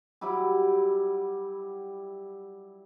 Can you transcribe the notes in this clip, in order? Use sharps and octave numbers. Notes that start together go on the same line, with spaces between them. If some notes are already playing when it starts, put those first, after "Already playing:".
F#3 G3 E4 G4